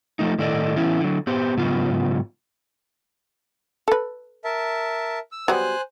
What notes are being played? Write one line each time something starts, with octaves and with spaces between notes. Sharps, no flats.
F3 A3 D#4
A2 D#3 A4 D5 D#5
E3 B3 C#4 E4
D3 F#3
B3 G4 C5
G#2 C#3 F#3 B3 F4
A4 B4
A#4 E5 A5
E6
F#3 G3 B3 C5 G#5 F#6